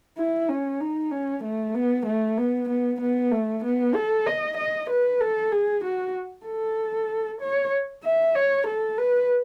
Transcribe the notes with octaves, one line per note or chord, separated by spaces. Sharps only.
E4
C#4
D#4
C#4
A3
B3
A3
B3
B3
B3
A3
B3
A4
D#5
D#5
B4
A4
G#4
F#4
A4
C#5
E5
C#5
A4
B4